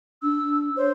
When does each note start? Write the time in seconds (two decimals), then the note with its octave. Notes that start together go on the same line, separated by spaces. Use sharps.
0.22 D4 E6
0.77 C5 C#5